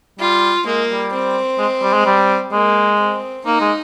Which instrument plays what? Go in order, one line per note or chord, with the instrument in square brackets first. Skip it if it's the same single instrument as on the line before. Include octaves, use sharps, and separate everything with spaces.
[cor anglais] G3 [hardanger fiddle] F4
[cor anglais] G#3 [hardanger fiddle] A#3
[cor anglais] G3
[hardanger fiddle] C4
[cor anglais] G#3
G3
G#3
G3
[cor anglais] G#3 [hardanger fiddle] A#3
[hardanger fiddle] C4
[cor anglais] A#3 [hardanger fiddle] D#4
[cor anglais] G#3